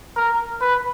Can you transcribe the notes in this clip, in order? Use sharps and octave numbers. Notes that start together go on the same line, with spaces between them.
A#4
B4